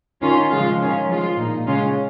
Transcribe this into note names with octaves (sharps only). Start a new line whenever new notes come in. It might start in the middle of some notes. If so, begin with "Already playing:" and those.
D#3 C#4 F4
C#3 F3 G#3 F4
D#3 C#4 F4
F3 G#3 F4
A#2 A#3 D#4
C#3 G#3 C#4 F4